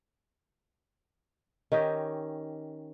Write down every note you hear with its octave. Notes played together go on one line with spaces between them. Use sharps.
D#3 C#4 G4 D#5